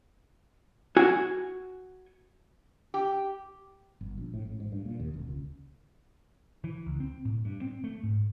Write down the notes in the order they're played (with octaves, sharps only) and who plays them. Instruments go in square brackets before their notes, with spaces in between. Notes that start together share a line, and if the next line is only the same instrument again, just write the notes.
[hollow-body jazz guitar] F#4 G#5
[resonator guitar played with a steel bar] G4
[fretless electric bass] G1
A#1
A2
A1
G#2
G2
A#2
D#2
E1
C#2
[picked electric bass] E3
C#2
C4
A2
G2
C4
A3
G#2